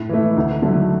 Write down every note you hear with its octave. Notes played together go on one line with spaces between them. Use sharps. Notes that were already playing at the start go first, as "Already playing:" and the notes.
Already playing: A2
E3 A3
D2
D3 F#3 A3